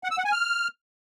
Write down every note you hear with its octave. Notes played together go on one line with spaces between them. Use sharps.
F#5
E6
F#5
G#5
F6